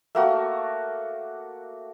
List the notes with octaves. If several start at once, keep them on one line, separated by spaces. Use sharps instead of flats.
A3 A#3 F#4